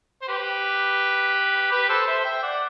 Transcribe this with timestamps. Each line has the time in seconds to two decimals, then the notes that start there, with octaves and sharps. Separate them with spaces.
0.22 C5
0.28 G4 B4
1.71 G4 B4
1.89 A4 C5
2.07 C5 E5
2.25 E5 G5
2.42 D5 F#5